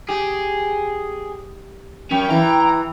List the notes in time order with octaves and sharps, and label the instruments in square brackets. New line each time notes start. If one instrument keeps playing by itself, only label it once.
[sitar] G4 [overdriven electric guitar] G#4
[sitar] F#2 [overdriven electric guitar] C#4 [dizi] G5
[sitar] E3 [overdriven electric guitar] A#5